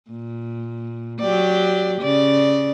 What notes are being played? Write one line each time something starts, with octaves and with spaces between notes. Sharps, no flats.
A#2
F#3 G4 D5
C#3 D5